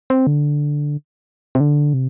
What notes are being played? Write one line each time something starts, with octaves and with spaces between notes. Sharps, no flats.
C4
D3
C3
D3
C3